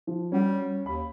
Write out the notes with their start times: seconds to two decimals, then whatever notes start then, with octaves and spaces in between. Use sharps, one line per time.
0.07 F3
0.32 G3 C#4 F#4
0.86 D#2 B5